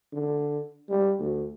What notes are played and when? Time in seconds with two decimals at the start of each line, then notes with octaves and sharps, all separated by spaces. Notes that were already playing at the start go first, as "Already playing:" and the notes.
0.13 D3
0.89 G3
1.19 D2